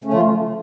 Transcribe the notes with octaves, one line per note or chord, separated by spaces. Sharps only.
C#3 A3 C#4
F3 F4